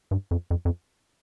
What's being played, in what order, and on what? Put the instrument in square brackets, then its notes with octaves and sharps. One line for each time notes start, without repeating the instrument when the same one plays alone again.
[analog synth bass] G2
F2
F2
F2